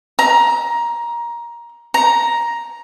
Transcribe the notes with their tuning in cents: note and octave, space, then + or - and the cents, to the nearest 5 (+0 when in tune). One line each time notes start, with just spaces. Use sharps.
A#5 +15
A#5 +10